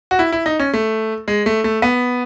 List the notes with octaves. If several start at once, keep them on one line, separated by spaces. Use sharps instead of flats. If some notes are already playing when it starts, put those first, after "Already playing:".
F#4
E4
E4
D#4
C#4
A3
G#3
A3
A3
B3